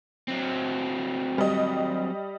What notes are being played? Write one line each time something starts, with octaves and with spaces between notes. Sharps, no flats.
F#3 C4
G3 D#5